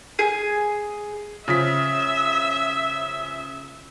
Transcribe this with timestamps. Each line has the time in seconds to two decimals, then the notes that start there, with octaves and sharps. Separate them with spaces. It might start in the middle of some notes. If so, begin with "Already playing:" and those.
0.19 G#4
1.48 C#3 F3 E5 B6